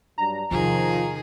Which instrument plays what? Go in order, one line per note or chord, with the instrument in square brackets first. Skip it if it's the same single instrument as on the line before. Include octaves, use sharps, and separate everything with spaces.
[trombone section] G2 F#3 D4 [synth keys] A#5
[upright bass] E2 C3 [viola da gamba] D#3 G#4 [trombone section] F3